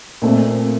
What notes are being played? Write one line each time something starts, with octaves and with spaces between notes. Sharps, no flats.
A#2 A3 C4